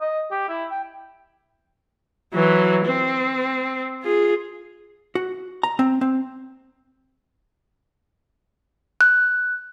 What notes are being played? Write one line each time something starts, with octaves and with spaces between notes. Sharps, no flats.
D#5
G4
E4
G5
E3 F#3
C4
F4 G#4
F#4
A#5
C4
C4
F#6